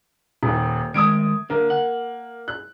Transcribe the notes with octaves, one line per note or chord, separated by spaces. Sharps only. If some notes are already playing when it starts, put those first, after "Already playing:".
D#1 D#2
D#3 G#3 A3 D#6 G#6 D7
D3 A#3
F#5
F#6